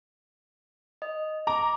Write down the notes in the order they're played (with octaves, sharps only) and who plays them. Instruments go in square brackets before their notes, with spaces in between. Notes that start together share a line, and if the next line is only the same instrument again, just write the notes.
[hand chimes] D#5
[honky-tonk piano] A#5 [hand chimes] D6